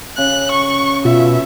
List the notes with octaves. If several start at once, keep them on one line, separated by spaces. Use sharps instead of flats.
C#3 F#6
C#6
B2 F4 E5